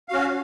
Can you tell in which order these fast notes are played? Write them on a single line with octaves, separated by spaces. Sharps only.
F5 F#4 C#4